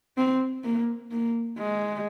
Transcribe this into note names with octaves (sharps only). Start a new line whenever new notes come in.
C4
A#3
A#3
G#3